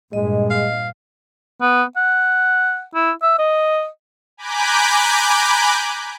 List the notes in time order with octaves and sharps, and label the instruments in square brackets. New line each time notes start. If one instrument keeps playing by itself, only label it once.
[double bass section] G2 A#2 [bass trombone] G#3 [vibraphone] D#5
[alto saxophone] F5
[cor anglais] B3
F#5
E4
E5
D#5
[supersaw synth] G#5 A#5 B5 D6 F#6 G6